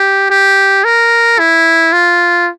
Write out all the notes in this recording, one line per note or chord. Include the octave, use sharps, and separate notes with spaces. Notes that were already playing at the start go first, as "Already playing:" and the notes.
Already playing: G4
G4
A#4
E4
F4